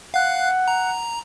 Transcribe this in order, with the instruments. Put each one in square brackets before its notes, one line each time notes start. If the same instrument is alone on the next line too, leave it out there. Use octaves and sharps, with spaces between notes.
[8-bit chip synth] F5 F#6 [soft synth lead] F#5
[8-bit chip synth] A#5